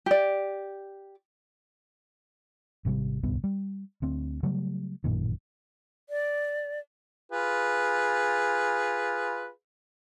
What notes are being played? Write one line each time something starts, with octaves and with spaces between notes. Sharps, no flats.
G4 D5
G#1 C3 F3 G3
D1 C2 G2 B3
G3
D2 C4
C#3 F#3 G3 A3
A1 F#2 A#2 D#3
D5
F4 G#4 B4